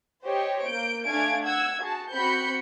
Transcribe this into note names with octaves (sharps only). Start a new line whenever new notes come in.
G4 C5 C#5 D#5 G5
A#3 G6 D7
A3 D4 F5 G#5 G#6 D7
F#5 E6 G#6
F#4 G#4 A5
C4 F#4 B5 G6 C#7